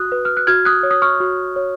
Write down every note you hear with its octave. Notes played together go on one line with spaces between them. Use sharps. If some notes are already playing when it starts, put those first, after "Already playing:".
Already playing: F#4 D#6 F#6
B4
F6
F#6
F#4 F6 G#6
D#6 F#6
C#5
D#6
C#6 F6
F#4
C#5